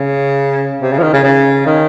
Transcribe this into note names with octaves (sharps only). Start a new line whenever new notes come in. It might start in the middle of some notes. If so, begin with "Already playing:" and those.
Already playing: C#3
C3
C#3
F3
D#3
C#3
C#3
D#3